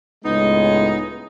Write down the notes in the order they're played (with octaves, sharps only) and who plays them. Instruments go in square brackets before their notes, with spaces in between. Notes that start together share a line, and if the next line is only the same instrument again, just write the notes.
[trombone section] C#2 A2 G#3 [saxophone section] B3 D#4